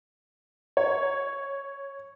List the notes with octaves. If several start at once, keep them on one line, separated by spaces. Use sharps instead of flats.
C#5